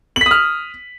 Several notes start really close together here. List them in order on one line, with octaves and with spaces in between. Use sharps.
F#7 B6 D#6 F6